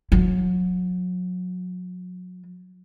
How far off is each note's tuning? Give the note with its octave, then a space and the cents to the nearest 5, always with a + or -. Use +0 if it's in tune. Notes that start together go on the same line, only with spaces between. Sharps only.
F#3 -30